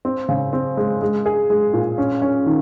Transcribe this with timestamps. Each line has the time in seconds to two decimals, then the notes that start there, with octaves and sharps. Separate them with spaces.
0.05 C4
0.29 C#3
0.53 C4
0.77 G#3
1.01 G#3
1.26 G#4
1.50 G#3
1.73 A#2
1.98 C#4
2.22 C#4
2.46 D#3